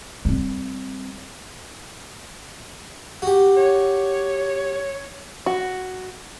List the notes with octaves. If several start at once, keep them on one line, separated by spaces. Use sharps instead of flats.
G3 C4
F#4 G4
C#5
F#4